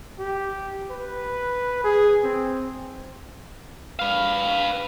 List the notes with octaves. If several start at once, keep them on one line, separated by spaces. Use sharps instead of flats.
G4
B4
G#4
C4
B4 F5